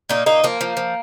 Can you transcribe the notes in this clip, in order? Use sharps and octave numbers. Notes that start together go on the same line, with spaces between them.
A#2 A#3 D#4
A#2 A#3 D#4
F3 A#3
F3
F3